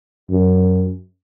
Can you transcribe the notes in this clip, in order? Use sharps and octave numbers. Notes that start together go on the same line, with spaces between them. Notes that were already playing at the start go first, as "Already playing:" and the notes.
F#2